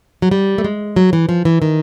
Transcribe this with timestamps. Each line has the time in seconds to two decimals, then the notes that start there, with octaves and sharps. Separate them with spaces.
0.22 F#3
0.31 G3
0.58 A3
0.64 G#3
0.96 F#3
1.13 E3
1.29 F3
1.45 E3
1.62 D#3